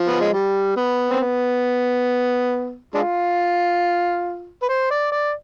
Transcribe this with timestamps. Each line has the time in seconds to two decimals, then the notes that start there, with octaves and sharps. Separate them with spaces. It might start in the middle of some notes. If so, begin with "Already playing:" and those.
Already playing: F3
0.08 B3
0.21 G#3
0.34 G3
0.77 B3
1.10 C4
1.21 B3
2.94 G#3 D4 F4
4.62 B4
4.68 C5
4.91 D5
5.12 D5